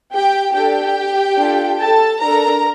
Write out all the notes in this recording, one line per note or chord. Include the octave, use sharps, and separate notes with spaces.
G4 G5
D4 G4 A4 G5
D4 F4 A4
A4 A5
D4 A4 A#4 A#5